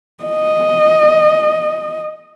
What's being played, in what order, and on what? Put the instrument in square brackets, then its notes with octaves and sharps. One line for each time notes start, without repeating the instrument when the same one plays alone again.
[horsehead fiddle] D#5